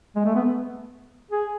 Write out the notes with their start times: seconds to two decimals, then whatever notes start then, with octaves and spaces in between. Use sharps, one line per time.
0.16 G#3
0.26 A3
0.35 B3
1.31 G#4